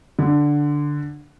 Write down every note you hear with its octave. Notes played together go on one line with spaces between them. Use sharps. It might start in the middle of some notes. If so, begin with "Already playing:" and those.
D3